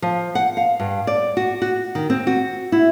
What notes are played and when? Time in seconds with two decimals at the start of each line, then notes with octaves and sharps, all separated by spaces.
0.02 F3
0.35 F#5
0.57 F5
0.79 G2
1.07 D5
1.37 F#4
1.62 F#4
1.95 D#3
2.10 C4
2.27 F#4
2.72 E4